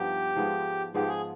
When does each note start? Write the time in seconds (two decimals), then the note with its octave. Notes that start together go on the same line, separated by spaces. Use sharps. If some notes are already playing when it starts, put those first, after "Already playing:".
Already playing: G2 F3 B3 D#4 G4
0.36 G#2 F3 G#3 B3
0.94 G#2 F3 G#3 B3 G4
1.08 G#4